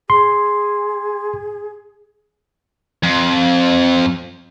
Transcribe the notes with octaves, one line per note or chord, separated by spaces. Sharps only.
G#4 C6
F2